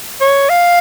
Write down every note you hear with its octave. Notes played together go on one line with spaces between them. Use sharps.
C#5
F5